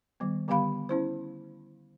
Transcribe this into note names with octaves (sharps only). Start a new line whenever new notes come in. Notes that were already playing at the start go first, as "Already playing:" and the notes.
D#3 G3 B3
D3 G3 B3 G4 F5 B5
C#4 E4 C5